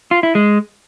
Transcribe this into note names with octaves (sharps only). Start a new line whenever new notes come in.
F4
E4
G#3